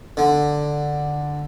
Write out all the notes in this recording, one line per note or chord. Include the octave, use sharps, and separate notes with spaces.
D3